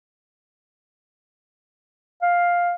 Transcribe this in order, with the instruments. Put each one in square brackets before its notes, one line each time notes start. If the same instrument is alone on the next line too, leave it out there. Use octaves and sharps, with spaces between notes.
[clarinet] F5